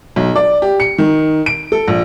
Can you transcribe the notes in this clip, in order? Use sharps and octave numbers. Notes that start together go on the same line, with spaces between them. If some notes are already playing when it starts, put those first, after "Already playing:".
B1
D5
G4
C#7
D#3
D7
A4
A#1